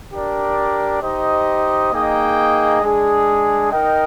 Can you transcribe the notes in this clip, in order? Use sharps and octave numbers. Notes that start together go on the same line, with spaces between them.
D4 G4 A#4 D5
D#4 G4 C5 D#5
A#3 D#4 G#4 D#5 G5
G#3 D4 G#4
D#4 A#4 D#5 G5